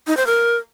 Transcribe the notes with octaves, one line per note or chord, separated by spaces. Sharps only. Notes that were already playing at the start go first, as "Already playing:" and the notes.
D#4
C5
A#4